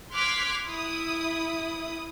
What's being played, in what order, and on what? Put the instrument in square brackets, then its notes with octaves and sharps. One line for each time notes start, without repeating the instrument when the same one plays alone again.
[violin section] C6 D6 F6 F#6 G#6 B6
E4 D#6